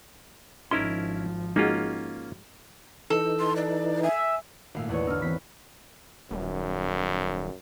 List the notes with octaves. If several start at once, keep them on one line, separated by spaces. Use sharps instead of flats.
G#1 F3 C#4 D#4 E4 A#4 C6
G#3 A#3 C#4 D#4 F4 F#4
E3 D#4 A4
C6
D5
E5 G#5
G#1 A#2 A3 F5 E6
E2 E4 G#4 B4 C#5 D5
D3 E3 D4 D#4 E6 F6
E2 E3 C4 B6
D#1 F#2